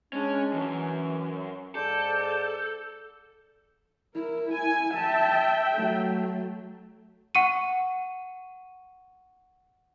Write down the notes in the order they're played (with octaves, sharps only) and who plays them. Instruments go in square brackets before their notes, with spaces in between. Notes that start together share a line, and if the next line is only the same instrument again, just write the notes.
[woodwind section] G#3 D4 [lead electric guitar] C#4
[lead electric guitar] F#2 [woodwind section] E3
[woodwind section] G#2 D5 D6 [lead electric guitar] A4 [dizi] G6
[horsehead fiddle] E4 [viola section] A#4
[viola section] G#5
[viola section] E5 G5 [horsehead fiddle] A5
[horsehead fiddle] F#3 A3
[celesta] F#5 C#6 C#7 D#7